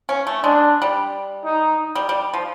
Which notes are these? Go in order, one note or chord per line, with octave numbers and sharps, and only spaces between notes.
C#4
A3
G#3 D4
G3
D#4
G3
G3
F3